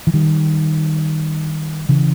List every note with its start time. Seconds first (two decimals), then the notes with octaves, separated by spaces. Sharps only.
0.07 E3
0.14 D#3 G3
1.89 C#3 E3